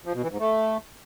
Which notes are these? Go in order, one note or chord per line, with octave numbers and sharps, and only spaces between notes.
F3
B2
E3
G#2
A3